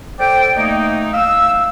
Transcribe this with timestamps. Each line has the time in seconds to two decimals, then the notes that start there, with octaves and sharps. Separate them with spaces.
0.18 A4 C5 D5 G5
0.56 A3 A#3 D#4
1.13 F5 E6